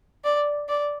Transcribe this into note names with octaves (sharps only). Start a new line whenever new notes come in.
D5
D5